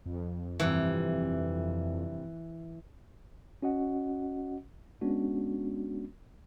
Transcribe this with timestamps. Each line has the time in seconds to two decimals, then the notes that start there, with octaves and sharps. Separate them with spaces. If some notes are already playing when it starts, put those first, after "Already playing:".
0.06 F2
0.60 G2 C3 E3 G3
3.62 C#4 F#4 D#5 F#5
5.01 G#3 B3 C#4 D4 F#4